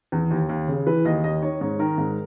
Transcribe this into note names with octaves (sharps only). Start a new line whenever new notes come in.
E2
D#2
D#2
C#3
E3 B4
D#2 D#5
D#2 D#5
D#3 C#5
G#2 C#5
D#3 A#4
G#2